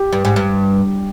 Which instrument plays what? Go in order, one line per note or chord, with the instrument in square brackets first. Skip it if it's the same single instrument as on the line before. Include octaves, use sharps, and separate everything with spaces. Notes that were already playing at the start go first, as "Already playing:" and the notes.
Already playing: [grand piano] G4
[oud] G2
G#2
G2